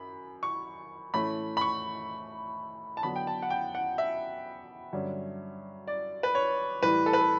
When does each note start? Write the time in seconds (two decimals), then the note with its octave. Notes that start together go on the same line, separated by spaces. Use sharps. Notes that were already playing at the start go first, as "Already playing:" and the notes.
Already playing: F#2 B5
0.43 C#6
1.14 A2 E3 A3 C#4 B5
1.57 B5
1.61 C#6
2.97 A5
3.03 D3 F#3 B3 B5
3.16 G5
3.27 A5
3.42 F#5
3.50 G5
3.75 F#5
3.98 E5
4.93 G2 D3 F#3 C#4
5.88 D5
6.23 B4
6.35 C#5
6.82 A2 E3 G3 B4
7.06 A4
7.13 B4
7.21 A4